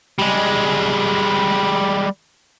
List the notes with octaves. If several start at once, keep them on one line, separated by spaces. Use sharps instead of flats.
G3 G#3